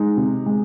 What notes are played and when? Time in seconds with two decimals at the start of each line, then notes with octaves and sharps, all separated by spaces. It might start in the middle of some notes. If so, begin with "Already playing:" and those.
Already playing: G#3 D#4
0.17 C3
0.46 G#3